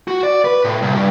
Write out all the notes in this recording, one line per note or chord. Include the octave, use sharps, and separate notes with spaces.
F#4
D5
B4
A2
C2
G2